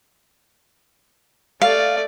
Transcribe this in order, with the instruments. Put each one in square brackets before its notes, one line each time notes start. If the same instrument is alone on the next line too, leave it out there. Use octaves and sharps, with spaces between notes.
[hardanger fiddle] A3 D5 [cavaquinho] F5